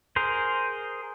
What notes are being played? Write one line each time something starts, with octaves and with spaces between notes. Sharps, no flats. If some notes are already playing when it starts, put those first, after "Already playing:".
G#4 A#4 C5